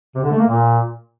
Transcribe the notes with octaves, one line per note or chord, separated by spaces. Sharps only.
C3
D3
A3
A#3
A#2